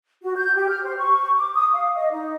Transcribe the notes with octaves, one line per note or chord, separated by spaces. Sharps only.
F#4
G6
G4
F6
C5
C#6
D6
D#6
F5
D#5
D#4